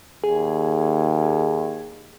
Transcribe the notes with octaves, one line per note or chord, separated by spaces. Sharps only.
D#2 G#4